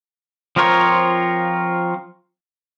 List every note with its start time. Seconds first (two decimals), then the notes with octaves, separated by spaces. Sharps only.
0.56 F3 C4 F4 A#4 C#5